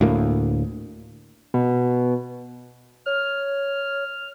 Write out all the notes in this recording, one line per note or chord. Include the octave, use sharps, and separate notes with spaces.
D2 A2 A#3
B2
C#5 F6